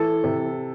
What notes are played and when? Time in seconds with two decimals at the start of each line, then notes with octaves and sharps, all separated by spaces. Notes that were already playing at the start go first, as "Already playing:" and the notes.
Already playing: E3 A4
0.24 C3